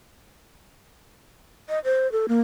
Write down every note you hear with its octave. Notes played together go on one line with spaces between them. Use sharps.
D#5
C5
A4
A#3